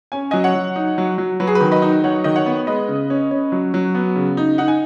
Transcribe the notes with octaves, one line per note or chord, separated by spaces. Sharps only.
C#4 G#5
F#3 D#5 G#5
C#5 F#5
F#3
D#4
F#3
F#3
F#3 B4
G#4
B4
D#3
B4 D#5
D#4
F#3 C#5 F#5
D#3 D#5
C#5 F#5
B3
G#3 B4 D#5
C#3
C#4
C#4
F#3
F#3
B3
C#3
D#4
D#4 F#5
G#5